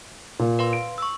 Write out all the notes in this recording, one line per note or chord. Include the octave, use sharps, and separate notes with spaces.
A#2
B4 F5 C6
D7
C#6 E6